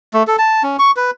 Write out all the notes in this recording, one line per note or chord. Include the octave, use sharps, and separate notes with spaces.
A3
A4
A5
C#4
C#6
B4